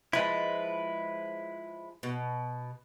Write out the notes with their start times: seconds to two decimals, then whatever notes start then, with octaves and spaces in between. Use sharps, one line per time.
0.13 F3 G#3 E4 B4
2.03 B2